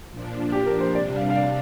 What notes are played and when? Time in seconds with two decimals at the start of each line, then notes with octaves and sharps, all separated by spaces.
0.10 A#2 F3 D4
0.52 G4
0.66 A#4
0.80 C5
0.94 C3 G3 D4 D5
1.16 F5
1.30 F5
1.36 D5